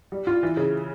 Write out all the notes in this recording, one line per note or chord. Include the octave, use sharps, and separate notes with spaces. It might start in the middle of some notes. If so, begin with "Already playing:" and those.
G3
F4
E3
C#3